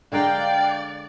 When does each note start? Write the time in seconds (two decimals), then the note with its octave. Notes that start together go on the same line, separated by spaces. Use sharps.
0.12 D3 G#3 A#4 D5 F5 G5 F#6